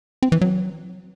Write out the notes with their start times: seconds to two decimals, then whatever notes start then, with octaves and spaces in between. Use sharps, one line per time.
0.23 C4
0.32 E3
0.41 F#3